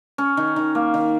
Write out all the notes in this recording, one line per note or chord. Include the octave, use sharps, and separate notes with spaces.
C#4
D#3
D#3
A#3
D#3